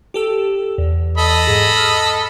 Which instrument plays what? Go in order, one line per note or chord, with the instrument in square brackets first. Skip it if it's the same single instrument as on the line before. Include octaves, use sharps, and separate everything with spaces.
[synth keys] G4 A4 E6
E2
[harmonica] A4 D#5 B5
[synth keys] G#2 G#4
E6 F6